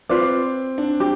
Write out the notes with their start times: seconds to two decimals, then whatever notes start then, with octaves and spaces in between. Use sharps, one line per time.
0.09 C4 F4 B4 D5
0.78 D4
1.00 G4